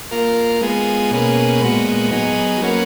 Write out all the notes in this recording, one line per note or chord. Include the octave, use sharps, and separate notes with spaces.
A#3 F4 A#4
G#3 B3 F4 G#4
B2 A#3 C#4 G#4 B4
A#2 G#3 B3 F#4
F#3 B3 D#4 G#4
F#3 A#3 C#4 F#4 B4